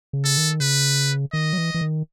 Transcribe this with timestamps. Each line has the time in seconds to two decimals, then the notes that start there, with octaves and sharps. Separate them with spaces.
0.13 C#3
0.25 A4
0.37 D#3
0.60 C#3 B4
1.33 D#3 D#5
1.53 F#3
1.58 E3
1.74 E3
1.81 D#3